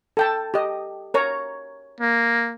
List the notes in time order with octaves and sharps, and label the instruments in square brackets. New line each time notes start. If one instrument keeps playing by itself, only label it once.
[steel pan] A4 G5 A5
G4 D#5
A#4 C#5 A#5
[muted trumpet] A#3